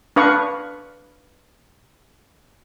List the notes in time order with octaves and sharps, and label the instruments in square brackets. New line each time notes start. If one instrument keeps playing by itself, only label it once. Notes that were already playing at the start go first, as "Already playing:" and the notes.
[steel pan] D4 B4 F5 C#6